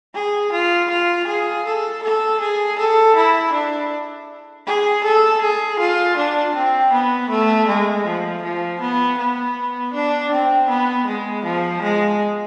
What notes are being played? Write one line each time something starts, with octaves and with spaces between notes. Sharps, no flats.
G#4
F4
F4
G#4
A4
A4
G#4
A4
E4
D4
G#4
A4
G#4
F4
D4
C4
B3
A3
G#3
F3
F3
B3
B3
D4
C4
B3
G#3
F3
G#3